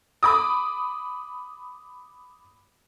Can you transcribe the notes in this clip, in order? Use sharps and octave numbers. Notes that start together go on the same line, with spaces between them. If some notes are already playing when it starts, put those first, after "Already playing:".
B5 D6 D#6